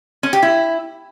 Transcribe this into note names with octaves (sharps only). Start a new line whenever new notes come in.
C#4
G4
E4